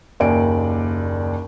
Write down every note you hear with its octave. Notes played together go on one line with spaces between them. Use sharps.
F#1 D#2 D5 G#5 D7